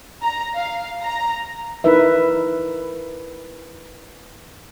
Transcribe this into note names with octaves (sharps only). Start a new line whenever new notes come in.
A#5
F5
A#5
D#4 E4 A#4 B4 E5